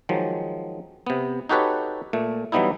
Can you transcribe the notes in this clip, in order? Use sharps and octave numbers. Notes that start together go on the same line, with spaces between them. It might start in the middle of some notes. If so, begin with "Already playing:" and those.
D#3 F3 F#3 G#3
C3 B3
D#4 F#4 G4 A4 B4 C#5
A#2 A3
E3 F#3 G3 B3 D#4 E4